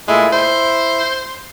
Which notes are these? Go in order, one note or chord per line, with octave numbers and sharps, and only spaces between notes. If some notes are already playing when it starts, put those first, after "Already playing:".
A#2 G#3 A3 E4
E4 C5